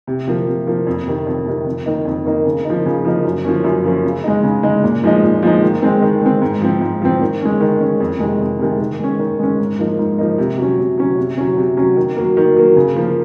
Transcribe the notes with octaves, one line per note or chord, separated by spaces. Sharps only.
C3
F3 A#3
C3
F3 A#3
F2
C3 D#3
F2
C3 D#3
F2
D#3 A#3 D#4
F2
D#3 A#3 D#4
C#3
F3 A#3 D#4
C#3
F3 A#3 D#4
F#2
F3 A#3 C#4
F#2
F3 A#3 C#4
C#3
G#3 D#4
C#3
G#3 D#4
A#2
F3 G#3 D#4
A#2
F3 G#3 D#4
D#3
G#3 C4
D#3
G#3 C4
G#2
F3 C4
G#2
F3 C4
D#3
G#3 C#4
D#3
G#3 C#4
F2
C3 D#3 G#3
F2
C3 D#3 G#3
D#3
G#3 C#4
D#3
G#3 C#4
G#2
F3 A#3 D#4
G#2
F3 A#3 D#4
C3
F#3 C#4
C3
F#3 C#4
C3
F#3 C#4
C3
F#3 C#4
D#3
F#3 A#3
D#3
F#3 A#3
C#3
F3 A#3